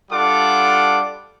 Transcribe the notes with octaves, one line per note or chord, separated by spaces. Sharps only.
G3 D4 F4 A4 F#5 D6